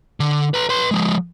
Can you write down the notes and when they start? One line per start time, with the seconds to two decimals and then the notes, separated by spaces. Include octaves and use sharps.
0.20 D3
0.54 B4 A#5
0.69 B4 C6
0.91 F3 G#3